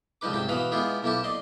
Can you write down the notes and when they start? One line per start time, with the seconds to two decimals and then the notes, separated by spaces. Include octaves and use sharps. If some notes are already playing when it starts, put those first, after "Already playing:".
0.21 C#2 F3 G3 D#4 B4 D6
0.33 C2 G#2 C3 C4 D6
0.48 B2 E3 B4 F5 B5 D#6
0.72 G#3 B3 E4 F4 G4 G#4
1.03 B1 A#3 E4 G4 A5
1.24 D5 D#5 C6